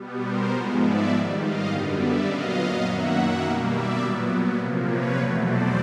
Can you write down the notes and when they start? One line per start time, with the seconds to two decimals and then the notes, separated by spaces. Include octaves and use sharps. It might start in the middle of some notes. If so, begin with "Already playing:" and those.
Already playing: B2 G3 B3
0.22 A#4 C5
0.51 G#2 F3 G#3 B3
0.80 D5 E5
1.09 G#2 D#3 G3
1.39 D#5 F5
1.68 F#2 D3 G3 B3
1.97 D5 E5
2.26 A#2 F#3 B3 D#5 F5
2.84 F#2 D#3 F#3 A#3 E5 F#5
3.42 B2 G3 A#3 D#5 F5
3.71 D5 E5
4.00 A#2 F#3 B3
4.59 C3 F3 A#3
4.88 B4 C#5
5.17 E2 B2 F#3 A3 C5 D5
5.46 C5 D5